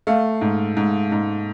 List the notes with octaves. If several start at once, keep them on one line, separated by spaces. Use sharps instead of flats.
A3 F5
G#2
G#2
G#2